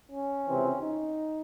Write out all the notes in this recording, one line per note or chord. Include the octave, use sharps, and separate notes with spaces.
C#4
C#2 C3 E3 C4
D#4